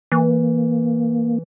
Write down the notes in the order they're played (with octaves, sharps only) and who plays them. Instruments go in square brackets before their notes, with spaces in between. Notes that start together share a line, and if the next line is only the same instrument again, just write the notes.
[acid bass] E3 [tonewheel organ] A#3